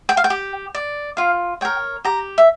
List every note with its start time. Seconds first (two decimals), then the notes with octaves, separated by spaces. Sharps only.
0.09 G5
0.17 F5
0.24 G5
0.30 G4
0.75 D5
1.17 F4 F5
1.61 A#4 C#5 G5
2.05 G4 A#5
2.38 E5